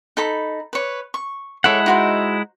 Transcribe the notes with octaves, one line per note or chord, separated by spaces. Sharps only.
D#4 A4 B5
B4 C#5
C#6
G#3 E4 A4 C#5 F#5
D#4 F#4 C5